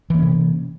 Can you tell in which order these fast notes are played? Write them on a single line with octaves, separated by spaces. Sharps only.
E3 A#3 C#4 C3